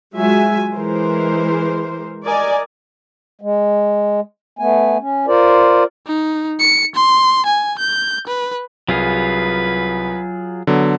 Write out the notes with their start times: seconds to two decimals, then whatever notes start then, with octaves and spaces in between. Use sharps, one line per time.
0.15 F#3 G#3 F4 F#4 E5 G#5
0.76 E3 G#3 A#4 C5
2.25 A#4 D5 D#5 G#5
3.41 G#3
4.59 A3 B3 G#5
5.00 C#4
5.27 F4 A#4 C5 D5
6.06 D#4
6.60 C#7
6.95 C6
7.46 G#5
7.79 G6
8.27 B4
8.89 C2 F#3 F4 G#4 B4
10.67 D3 F#3 B3